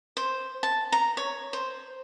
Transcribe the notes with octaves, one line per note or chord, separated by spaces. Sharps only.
C5
A5
A#5
C#5
C5